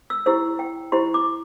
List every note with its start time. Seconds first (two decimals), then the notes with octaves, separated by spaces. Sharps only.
0.10 E6
0.26 E4 G4 C5 E6
0.59 G5
0.92 E4 G4 C5 C6
1.14 D6